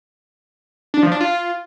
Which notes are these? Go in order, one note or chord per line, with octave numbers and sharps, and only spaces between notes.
D4
F3
D4
F4